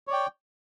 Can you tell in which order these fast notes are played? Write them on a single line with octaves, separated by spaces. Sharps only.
C#5 D5 G5